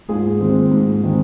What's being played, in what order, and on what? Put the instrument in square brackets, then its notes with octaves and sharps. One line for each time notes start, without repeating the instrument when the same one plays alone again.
[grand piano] G#2 F4 G#4
D#3 G#3 C4
G#2
D#3 G#3 C4